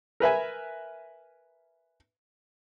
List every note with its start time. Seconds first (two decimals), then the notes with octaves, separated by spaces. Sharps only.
0.20 A#4 B4 E5 G#5